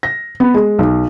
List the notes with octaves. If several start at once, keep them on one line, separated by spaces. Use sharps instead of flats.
A#6
B3
G#3
B1